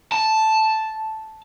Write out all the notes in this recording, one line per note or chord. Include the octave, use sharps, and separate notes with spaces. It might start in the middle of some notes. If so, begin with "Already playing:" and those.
A5